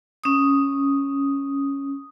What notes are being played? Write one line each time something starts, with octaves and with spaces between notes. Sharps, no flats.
C#4 D#6